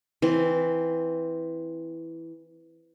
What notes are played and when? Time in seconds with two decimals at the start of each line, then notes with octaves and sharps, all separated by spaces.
0.22 E3 C4